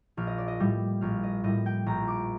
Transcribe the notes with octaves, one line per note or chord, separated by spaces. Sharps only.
A#1 F5
D#5
D5
D#5
A2 G3
A#1 F5
D#5
A2 G3 D#5
G5
A#1 A#5
D6